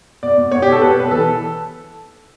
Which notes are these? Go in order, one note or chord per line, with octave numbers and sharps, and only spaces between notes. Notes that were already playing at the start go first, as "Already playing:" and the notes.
B2 D5
B2
B2 C#5
G4
B2
A4
B2 B4
B2 B4
E3 A4